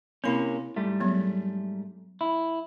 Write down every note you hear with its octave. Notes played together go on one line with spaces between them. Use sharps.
C3 A#3 C4 C#4 E4 B5
G#2 G3 A3
F#3 B3
E4